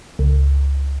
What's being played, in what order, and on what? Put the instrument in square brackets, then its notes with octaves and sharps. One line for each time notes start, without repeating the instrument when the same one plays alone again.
[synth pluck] C#2